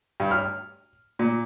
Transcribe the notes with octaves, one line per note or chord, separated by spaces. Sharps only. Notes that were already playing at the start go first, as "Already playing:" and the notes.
G2
F6
A#2